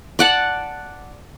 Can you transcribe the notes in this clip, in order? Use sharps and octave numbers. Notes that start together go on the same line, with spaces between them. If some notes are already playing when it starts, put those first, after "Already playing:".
D5 F#5 A5